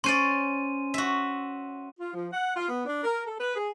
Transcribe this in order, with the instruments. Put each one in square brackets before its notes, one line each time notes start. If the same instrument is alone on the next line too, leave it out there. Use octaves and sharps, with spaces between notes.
[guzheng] C#4 C5 D5 [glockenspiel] C6 D#7
[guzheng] F#4 E5
[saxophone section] F4
F3
F#5
F4
B3
D4
A#4
A4
B4
G#4